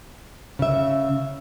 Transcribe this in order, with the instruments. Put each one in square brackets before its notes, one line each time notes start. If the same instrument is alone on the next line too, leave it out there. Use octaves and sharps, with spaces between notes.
[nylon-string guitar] C#3 E5